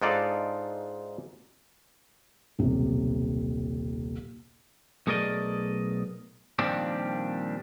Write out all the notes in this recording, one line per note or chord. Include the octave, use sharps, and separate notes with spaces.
G#2 D4 D#4 F4 A4 D5
D#1 B1 C3
B1 A3 G#4 A#4 D5 D#5
A#2 D#3 F3 G3 C4 D4